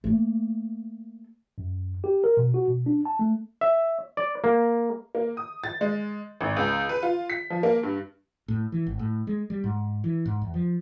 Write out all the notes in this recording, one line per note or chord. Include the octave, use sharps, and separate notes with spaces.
A3 A#3
F#2
G4
A#4
B2
F#4
B2
D4
A5
A3
E5
D5
A#3
A#3
D#6
A6
G#3
G#1
C#2
B4
F4
B6
F3
A#3
G2
A2
E3
G#1
A2
G#3
G3
G#2
E3
G#2
E2
F3